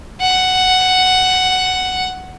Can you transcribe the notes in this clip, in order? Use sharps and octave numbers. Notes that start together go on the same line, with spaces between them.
F#5